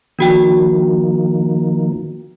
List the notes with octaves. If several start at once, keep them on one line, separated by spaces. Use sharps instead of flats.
D#3 F3 A#3 D4 F#4 G5